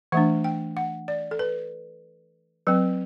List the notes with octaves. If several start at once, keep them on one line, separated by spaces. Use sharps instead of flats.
E3 A3 D4 F#5
G5
F#5
D5
A4
B4
F#3 C4 B4